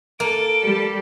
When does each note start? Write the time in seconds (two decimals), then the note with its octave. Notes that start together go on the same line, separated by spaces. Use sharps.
0.20 A#3 A4 D7
0.64 G3